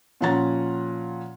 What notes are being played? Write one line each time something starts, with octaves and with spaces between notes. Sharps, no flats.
A#2 F3 C#4 F#5 A#5 A6